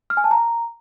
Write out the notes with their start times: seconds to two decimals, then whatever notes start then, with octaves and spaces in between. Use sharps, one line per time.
0.10 F6
0.17 G#5
0.24 A5
0.31 A#5